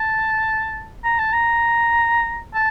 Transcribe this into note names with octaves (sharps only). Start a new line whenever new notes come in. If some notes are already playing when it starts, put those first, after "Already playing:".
Already playing: A5
A#5
A5
A#5
A5